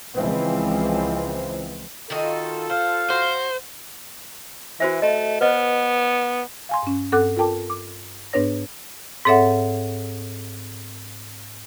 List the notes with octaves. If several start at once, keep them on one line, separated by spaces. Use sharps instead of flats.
C#2 E3 F3 C4
D#3 F4 F#4 A4 D#5
C5 F5
F#4 C5
E3 F#4 C5 E5
A3 D#5
B3 B4 C5 D#5
F5 G#5 C6
G2 C#4
G2 C4 A4 F#5 D6 F#6
F4 A4 A#4 G5 A5 D6
D6
G#2 B3 D4 B4 C#5 A#6
G#2 C4 A4 C#5 E5 F#5